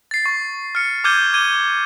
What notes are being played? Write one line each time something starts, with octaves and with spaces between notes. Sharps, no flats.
A6 C7
C#6
F6 C#7
D6 F6 G6 G#6 D#7 G7
D6 G#6 D#7 G7